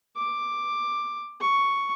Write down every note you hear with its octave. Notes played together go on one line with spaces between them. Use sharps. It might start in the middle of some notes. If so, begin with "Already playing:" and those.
D6
C#6